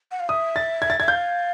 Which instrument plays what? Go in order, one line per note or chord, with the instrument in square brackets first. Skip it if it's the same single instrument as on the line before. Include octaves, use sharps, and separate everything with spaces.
[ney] F#5
F5
[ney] E5 [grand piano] D#6
[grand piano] A6
G#6
A6
[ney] E5 [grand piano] G#6
[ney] F5 [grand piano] G6